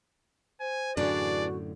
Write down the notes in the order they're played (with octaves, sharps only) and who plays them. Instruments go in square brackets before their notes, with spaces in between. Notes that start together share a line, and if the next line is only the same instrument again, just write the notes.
[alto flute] C5 [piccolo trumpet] G#5
[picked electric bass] F#2 A2 D3 [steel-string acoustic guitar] E3 D4 G#4 [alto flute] F#4 [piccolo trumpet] D5